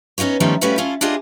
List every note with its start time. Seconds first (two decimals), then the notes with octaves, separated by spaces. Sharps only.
0.18 B3 C#4 D#4 F4 C#5
0.40 D#3 F3 G3 A3 B3 C#4
0.61 G3 A3 C#4 F#4 B4 F5
0.78 C#4 E4 F4 A4
1.01 D4 E4 F4 G4 G#4 D#5